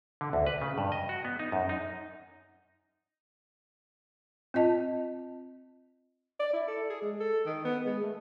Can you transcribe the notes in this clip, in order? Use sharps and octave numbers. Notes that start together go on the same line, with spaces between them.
D3
D2
B4
C#3
G2
D#5
F#4
B3
D#4
F#2
D#4
C4 F4 D#5 A5
D5
E4
A4
G#4
G#3
A4
D#3
B3
G#3
A3